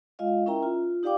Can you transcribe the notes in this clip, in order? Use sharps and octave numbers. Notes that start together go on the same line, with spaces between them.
G#3 F4 D#5 F5
C#4 E4 A#4 E5 G5 A#5
F4
D#4 G4 D5 F5 G5 D6